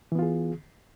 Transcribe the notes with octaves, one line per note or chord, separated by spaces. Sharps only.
E3 B3 F4 G#4